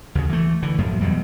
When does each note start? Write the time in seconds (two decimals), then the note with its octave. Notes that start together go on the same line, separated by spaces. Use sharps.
0.15 D2 C#3
0.29 E3 A3
0.62 D3 E3
0.78 F#2 A2 F3
1.01 E2 B2 F#3 G3